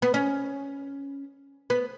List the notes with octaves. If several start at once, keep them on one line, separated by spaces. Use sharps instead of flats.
B3
C#4
B3